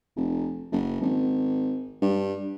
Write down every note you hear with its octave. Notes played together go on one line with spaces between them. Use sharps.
F1
F#1
G#1
G2